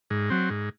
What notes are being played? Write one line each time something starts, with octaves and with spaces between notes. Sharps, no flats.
G#2
F#3 C4
G#2